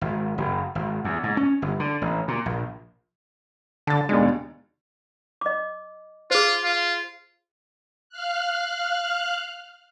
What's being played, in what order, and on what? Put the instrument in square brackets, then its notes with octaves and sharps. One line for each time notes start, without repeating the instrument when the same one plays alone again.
[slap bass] G#1
F#1
G#1
E2
G#2
C#4
G1
D3
A1
A#2
A#1
[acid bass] D3 [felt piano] A5 A6
[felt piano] D#2 B2 D4 [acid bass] G#3
[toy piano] D#5 D6
[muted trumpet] F4 [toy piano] G#4 C5
[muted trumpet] F4
[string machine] F5 F6 F#6